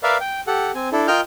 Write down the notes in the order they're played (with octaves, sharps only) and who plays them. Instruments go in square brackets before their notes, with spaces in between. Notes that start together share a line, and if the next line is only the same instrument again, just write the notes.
[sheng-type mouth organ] A#4 B4 D5 E5 F5
G5
G4 A4 F#5
C4 G#5
D4 E4 A4
F4 A#4 D#5 G5 F6 G6